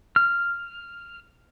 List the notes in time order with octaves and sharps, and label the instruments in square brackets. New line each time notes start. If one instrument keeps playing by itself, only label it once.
[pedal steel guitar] F6